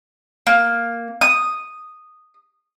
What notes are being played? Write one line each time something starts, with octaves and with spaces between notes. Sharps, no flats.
A#3
D#6